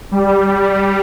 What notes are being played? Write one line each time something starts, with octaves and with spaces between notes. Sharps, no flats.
G3